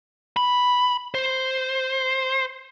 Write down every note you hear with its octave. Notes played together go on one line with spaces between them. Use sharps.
B5
C5